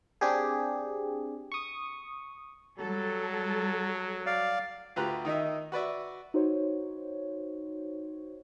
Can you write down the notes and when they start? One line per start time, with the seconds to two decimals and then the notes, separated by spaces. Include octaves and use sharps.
0.21 C4 D4 G4 G#4
1.52 C#6 D#6
2.78 F#3 G3 A4
4.26 D5 F5
4.96 D2 F4 G4 B4 A#5 F#6
5.25 D#3 D#4 D#5 E5
5.72 F#4 B4 D5 E5
6.34 D#4 F#4 C5 C#5